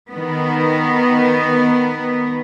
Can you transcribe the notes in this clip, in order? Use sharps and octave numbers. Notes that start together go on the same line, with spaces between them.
D#3 B3